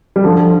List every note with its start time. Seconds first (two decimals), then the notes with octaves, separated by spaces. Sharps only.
0.16 G3
0.24 D3 F3